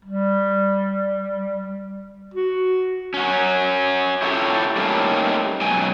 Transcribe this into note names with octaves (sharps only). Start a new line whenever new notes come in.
G3
F#4
C#4 F#4
E4 F4 G4 A4 C#5
G3 A3 A#3 C4 C#4 D#4
B2 F#3 G#3 C#4 G5 G#5